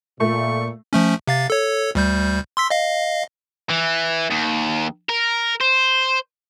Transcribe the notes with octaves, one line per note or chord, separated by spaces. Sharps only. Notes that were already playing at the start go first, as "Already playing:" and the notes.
A#2 A3 C#6
F3 A3 C#4
C3 F5 A6
A4 C#5
D2 G3 G6
C6 E6 B6
D#5 F5
E3
D#2
A#4
C5